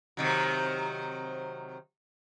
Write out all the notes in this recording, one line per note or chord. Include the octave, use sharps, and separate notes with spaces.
C3 D#3 F#3